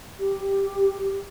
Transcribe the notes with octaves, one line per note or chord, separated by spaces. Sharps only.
G4